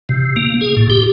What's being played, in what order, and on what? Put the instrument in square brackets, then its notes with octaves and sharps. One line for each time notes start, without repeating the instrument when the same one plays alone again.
[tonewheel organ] C3
A#3
G#4
A2
G4